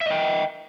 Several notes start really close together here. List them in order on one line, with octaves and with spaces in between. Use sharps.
E5 D#5 G5